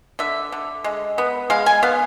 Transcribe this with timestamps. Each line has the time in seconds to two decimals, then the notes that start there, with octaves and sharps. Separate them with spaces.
0.19 D3 E5
0.52 D3
0.84 G#3
1.18 B3
1.50 G#3 F5
1.66 G#5
1.83 B3 F5